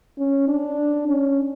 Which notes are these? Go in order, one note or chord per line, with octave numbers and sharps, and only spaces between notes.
C#4
D4
C#4